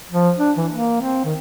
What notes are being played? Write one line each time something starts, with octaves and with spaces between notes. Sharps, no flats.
F3
D4
E3
A#3
C4
D#3